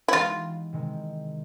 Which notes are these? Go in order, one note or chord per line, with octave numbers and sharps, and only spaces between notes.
E4
E3 G#3 B3 D#4 F4 G4
C3 D#3 G#3 C4